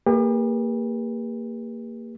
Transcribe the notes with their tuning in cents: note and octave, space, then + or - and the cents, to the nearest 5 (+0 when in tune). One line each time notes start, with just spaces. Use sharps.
A#3 -20 G4 +45 B4 -35